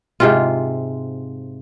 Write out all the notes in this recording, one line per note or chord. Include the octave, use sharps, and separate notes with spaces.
G#2 C3 F4